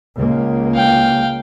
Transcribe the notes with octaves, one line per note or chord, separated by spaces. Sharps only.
C#2 A#3
F5 G5